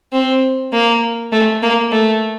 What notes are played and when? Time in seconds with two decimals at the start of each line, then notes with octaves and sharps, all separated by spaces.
0.13 C4
0.73 A#3
1.32 A3
1.63 A#3
1.92 A3